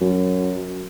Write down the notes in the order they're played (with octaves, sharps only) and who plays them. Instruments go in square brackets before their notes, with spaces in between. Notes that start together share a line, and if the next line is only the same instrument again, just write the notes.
[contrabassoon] F#2